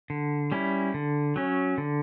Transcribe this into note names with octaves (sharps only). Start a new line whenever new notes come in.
D3
G3 C#4 E4
D3
F#3 C#4
D3